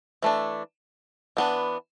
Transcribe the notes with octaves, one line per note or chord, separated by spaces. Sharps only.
E3 A3 D4
E3 B3 D4